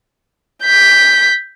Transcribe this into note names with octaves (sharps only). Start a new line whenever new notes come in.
G6 B6